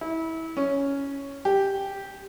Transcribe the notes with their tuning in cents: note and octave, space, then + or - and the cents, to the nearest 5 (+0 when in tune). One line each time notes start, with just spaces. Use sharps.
E4 -25
C#4 +5
G4 +0